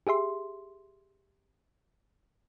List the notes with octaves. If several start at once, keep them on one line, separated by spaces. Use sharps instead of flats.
G4 G#4 E5 C6